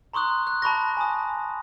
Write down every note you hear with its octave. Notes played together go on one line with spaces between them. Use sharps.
A#5 C6 C#6 D#6 F#6
F#6
A5 B5 C#6 A#6
G#5 A5 D#6